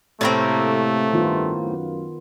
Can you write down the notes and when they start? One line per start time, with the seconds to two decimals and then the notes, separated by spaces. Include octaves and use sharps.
0.21 A2 C3 A3 A#3 C4
1.13 G2 D#3 B3 F4
1.62 F#2